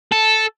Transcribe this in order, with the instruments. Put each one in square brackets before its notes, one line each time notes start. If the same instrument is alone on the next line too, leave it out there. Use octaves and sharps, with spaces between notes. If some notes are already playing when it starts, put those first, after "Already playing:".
[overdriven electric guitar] A4